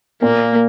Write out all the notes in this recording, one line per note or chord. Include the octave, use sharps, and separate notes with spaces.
A#2 A#3